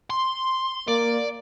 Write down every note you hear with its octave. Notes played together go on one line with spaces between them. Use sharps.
C6
A#3 D5